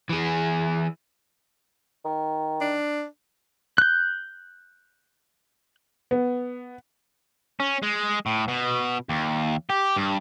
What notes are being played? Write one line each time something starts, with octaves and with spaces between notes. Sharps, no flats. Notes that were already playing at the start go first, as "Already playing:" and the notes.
E3 G#4
D#3
D4
F#6 G6
B3
C#4
G#3
A2
B2
D#2
G4
G2